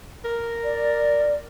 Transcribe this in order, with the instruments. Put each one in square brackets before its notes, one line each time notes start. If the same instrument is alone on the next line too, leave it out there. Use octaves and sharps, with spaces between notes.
[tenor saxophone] A#4
[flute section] D5